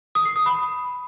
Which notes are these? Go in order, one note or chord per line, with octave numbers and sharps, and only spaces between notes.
D#6
C7
D#6
B5